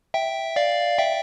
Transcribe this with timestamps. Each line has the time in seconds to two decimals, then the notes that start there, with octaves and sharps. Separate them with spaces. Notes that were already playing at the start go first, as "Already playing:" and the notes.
0.14 E5 G5
0.56 D5 F5
0.98 E5 G5